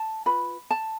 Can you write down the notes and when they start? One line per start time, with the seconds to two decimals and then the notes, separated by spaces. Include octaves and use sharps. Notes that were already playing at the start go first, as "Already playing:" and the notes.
Already playing: A5
0.26 F4 B4 B5
0.70 A5